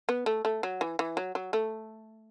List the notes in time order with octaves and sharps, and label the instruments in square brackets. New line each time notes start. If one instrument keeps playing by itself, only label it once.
[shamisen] B3
A3
A3
F#3
E3
E3
F#3
F#3
A3